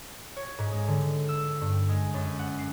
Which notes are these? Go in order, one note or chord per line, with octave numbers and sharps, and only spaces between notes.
C#5
G#2
G#3
D3
E6
G2
G#3
F#2
F#5
C7